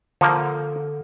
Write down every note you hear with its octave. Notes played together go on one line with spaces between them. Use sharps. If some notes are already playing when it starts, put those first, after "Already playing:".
D3 F3 A#3